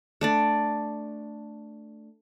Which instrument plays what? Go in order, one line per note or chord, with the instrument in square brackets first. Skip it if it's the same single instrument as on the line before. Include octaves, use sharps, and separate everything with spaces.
[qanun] A3 D4 D5